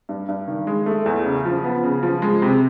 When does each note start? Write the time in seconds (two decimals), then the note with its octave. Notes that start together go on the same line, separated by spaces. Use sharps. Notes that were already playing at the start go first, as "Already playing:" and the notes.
0.09 G2
0.28 G2
0.48 D#3
0.67 G#3
0.86 A3
1.06 E2
1.25 C#3
1.45 F3
1.64 B3
1.84 C#3
2.03 F3
2.22 G#3
2.42 C3